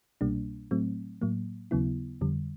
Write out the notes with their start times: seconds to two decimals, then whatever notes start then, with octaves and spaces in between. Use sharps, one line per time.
0.21 C2 B2 G3 A#3 D4
0.71 A2 F#3 A3 C4
1.22 A2 F#3 A#3
1.71 D#2 C#3 F#3 B3 E4
2.21 F2 D3 G3